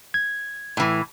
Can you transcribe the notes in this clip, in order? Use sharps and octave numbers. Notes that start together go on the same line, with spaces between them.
G#6
A2 E3